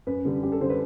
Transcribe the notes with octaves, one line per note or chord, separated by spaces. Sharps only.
F#2 B4
D3 G3
F#2 G4
A4
D3 G3 C5
B4